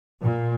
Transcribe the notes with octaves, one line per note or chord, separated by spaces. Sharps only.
A#2